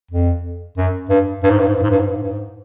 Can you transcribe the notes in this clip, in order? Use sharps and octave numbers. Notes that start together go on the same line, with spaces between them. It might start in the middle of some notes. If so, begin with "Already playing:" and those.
F2
F#2
G2
G2
G#2
G2
G#2
G2
G#2
G2
G#2
G2
G#2
G2
G#2